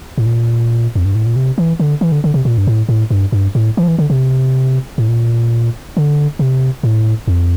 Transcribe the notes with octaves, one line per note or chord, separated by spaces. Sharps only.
A2
A#2
F2
G2
A2
A#2
C3
E3
D3
E3
D3
D3
C3
A#2
G2
A2
A2
G2
G2
A2
E3
F3
E3
D3
C3
A2
A#2
D3
C3
A2
F2